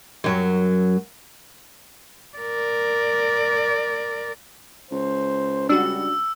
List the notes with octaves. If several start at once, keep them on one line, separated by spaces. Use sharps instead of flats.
F#2 F#3
A#4 D5
C#2 C5
G3 D4 F#4 E6